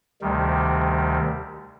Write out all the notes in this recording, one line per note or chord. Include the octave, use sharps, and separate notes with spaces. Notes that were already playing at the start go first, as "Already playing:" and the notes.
D2 C3 D#3 G3